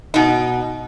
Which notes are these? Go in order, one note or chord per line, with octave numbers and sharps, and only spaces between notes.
B2 D#4